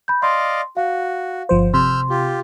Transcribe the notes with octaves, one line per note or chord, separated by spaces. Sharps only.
B5 G6
D5 D#5 F5 C6
F#4 F5
G1 F3 C5
C3 C6 E6 F6 G6
F4 G4